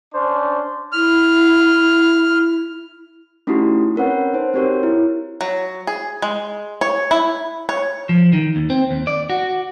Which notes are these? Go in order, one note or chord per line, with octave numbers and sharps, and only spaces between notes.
C#4 D4 C5
E4 F6
A3 C#4 D#4 E4 F#4 G4
C4 C#4 A#4 B4 C#5 F#5
D#4 C5
C4 F#4 G4 A#4 C#5
E4
F#3
G#4
G#3
C#5
E4
C#5
F3
D#3
D#2
C4
D#2
D5
F#4